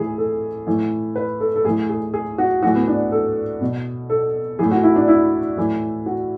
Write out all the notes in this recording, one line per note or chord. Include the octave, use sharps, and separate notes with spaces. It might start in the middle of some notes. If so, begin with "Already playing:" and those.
Already playing: A2 E3 G#4
A4
A2 E3
B4
A4
A4
A2 E3 G#4
G#4
G#4
F#4
A2 E3 F#4
B3
D4
A4
B2
A4
A2 E3 G#4
F#4
E4
D4
E4
A2 E3
F#4